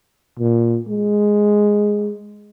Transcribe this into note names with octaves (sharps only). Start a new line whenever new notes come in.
A#2
G#3